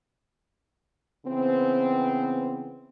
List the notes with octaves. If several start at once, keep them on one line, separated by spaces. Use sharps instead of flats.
C#3 E3 B3 C4